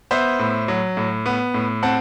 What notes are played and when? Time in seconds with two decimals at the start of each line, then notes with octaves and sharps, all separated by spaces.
0.11 B3 C5 E5
0.39 A2
0.68 F#3
0.97 A2
1.26 B3
1.54 A2
1.83 C4 F#5 A5